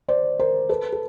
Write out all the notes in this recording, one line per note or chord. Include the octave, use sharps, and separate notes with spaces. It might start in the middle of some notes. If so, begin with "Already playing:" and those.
C5 D5
A#4 C5
A4 B4
A4